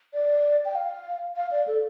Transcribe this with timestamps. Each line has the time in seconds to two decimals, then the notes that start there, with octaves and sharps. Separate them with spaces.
0.13 D5
0.65 G5
0.75 F5
1.36 F5
1.51 D5
1.67 A4